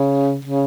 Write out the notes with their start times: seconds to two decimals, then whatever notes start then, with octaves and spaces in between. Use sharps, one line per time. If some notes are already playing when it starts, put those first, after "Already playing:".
Already playing: C#3
0.45 C#3